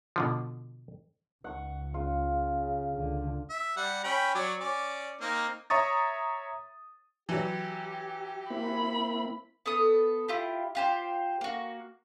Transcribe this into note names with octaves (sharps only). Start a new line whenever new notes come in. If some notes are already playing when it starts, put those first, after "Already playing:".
B2 D3 F3
C#2 F#5 C#6
C#3 F4
C#2 D3
E5
G3 F#5
C#4 G5 B5
F#3 C#5 D5
C#4 D5
A#3 C4 D#4
C#5 E5 A#5 C#6 D#6 A6
E3 F#3 G4
A#3 C4 E4 B5
B3 A4 D#6
E4 F4 G4
F4 G4 C5
A#3 F#4